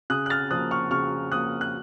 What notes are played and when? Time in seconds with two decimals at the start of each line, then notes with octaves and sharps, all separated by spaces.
0.10 C#3 D#6 F#6
0.26 F#6
0.30 F6 A6
0.51 F3 A#3 D#6 F#6
0.71 C#6 F6
0.91 C#3 C#6 F6
1.32 F3 A#3 D#6 F#6
1.61 F#6